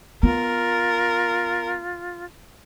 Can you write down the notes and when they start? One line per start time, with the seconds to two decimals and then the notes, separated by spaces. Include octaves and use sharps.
0.23 B3 F4 A#4